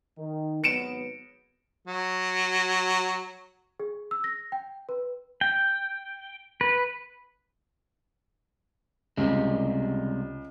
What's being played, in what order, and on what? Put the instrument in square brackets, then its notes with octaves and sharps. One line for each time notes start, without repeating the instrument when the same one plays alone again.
[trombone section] D#3
[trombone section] G#1 F#3 B3 [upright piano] C#7 D7 E7
[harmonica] F#3
[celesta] G#4
E6
A#6
G5
B4
[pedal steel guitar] G5
B4
[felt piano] C#2 [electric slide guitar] C3 G3 G#3